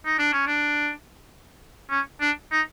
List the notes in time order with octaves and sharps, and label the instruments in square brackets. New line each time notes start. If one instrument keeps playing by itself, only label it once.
[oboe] D#4
D4
C#4
D4
C#4
D4
D#4